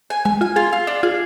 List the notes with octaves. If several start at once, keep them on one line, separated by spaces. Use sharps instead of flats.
G#5
G#3 G#5
F4 G#5
F4 G#4
F4
D4
F4 G#4